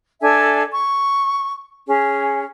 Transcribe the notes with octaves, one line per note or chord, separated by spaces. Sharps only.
D4 A4 E5 G#5
C#6
C#4 G#4